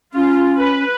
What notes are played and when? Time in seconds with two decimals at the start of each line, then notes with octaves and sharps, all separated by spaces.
0.14 C#4 F4
0.58 B4